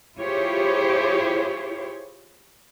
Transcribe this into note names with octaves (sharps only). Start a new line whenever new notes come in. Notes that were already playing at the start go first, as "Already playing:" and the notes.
E4 F4 G4 G#4 C5 C#5